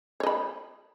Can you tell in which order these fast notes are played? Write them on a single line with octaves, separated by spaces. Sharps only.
C#5 D#5 B5